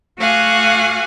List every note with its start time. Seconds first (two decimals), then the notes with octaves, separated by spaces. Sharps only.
0.18 A3 F#4 F5 F#5 G#5 D6